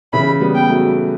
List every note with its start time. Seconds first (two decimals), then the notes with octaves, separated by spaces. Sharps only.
0.13 C#3 E3 B5
0.41 G3 B3
0.55 G5
0.69 F#3 A3